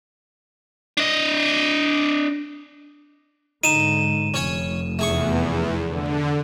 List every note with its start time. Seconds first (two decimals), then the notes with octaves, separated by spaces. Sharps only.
0.97 D4 D#5
3.64 G#2 D3 D#4 D#7 E7
4.34 F1 C#4 C#5 G#5
4.99 E2 A3 G#4 C#6
5.89 D3